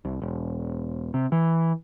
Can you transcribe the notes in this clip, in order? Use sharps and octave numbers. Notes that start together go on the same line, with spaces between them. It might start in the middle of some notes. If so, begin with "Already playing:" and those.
C2
E1
C3
E3